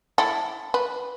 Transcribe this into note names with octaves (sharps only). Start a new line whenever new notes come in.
E4 A4
B4